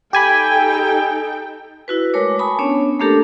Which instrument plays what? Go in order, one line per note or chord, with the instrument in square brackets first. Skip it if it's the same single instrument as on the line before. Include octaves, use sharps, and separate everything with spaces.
[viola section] D#4 A4 G5 [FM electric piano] G4 G#5 B5
[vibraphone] E4 F#4 B4
G#3 A3 A#4 C#5 D6
G#5 A5 B5 C#6 D#6
B3 C#4 D4 C#5
A3 A#3 D4 G4 A4 A#4